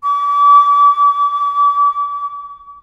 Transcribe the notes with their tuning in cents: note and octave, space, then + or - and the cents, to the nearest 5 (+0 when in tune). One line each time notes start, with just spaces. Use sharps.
D6 -35